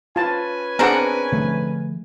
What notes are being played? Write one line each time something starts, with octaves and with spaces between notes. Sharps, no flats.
C#4 F4 B4 G#5 A5
B3 C4 D4 G#4 A#4 F#5
D3 F3 A3